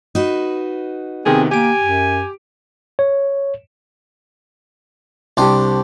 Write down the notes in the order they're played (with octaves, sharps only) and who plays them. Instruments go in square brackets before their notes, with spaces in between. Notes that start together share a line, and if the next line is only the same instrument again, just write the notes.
[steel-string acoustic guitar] D#4 F#4 B4
[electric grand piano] C3 D#3 B3 [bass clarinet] C4 [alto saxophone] G#4
[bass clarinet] A#3 [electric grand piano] G4 D7 [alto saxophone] G#5
[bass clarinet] F#2
[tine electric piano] C#5
[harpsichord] C2 C5 G5 [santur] D4 G4